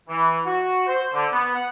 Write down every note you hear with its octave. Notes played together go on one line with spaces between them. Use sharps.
E3
F#4
C5
D3
B3
F#5